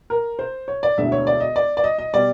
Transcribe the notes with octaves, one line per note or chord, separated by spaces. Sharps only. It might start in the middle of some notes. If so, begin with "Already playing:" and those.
A#4
C5
C#5
D5
E1 D2 D3 E5
C#5
D5
D#5
D5
D5
D#5
D#5
B2 G3 D5